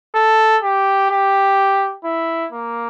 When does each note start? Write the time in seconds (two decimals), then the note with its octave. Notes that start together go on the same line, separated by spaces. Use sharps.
0.15 A4
0.63 G4
1.10 G4
2.04 E4
2.52 A#3